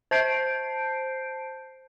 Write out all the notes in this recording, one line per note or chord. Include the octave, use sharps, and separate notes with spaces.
C5 A5 G6 C7 D7